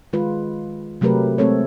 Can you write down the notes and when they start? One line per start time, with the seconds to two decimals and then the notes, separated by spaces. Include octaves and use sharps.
0.13 D#3 G#3 F4 B4
1.01 C3 F#3 A3 G4 A#4 B4
1.38 G#3 A3 C4 A4 C#5